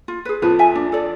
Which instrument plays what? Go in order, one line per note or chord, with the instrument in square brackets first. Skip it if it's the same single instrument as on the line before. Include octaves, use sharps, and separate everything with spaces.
[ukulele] F4
G#4 B4
[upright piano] F2 F3 [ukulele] B4
[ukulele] E5 G#5
D4
A4 D5